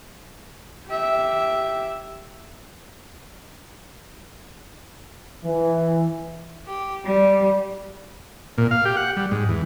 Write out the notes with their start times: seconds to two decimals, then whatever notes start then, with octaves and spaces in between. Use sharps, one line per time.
0.87 G4 E5
5.45 E3
6.67 G4
7.05 G3
8.58 A#2
8.71 F5
8.85 G4
8.97 F#5
9.17 G3
9.31 G#2
9.49 E2